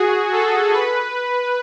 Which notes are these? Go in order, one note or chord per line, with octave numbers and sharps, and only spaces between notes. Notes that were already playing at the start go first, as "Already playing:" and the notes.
Already playing: F#4 G#4
A4
B4